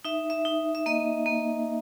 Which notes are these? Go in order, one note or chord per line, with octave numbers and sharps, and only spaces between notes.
D#4 E5
E5
D#4
E5
A#3 D#5
A#3